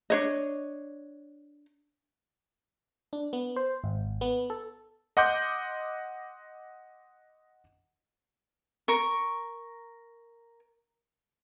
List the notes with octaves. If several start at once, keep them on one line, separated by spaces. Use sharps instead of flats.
D4 C#5 D#5
D4
B3
C5
G#1
B3
A4
D#5 F#5 C6 D6 G6
A#4 C#6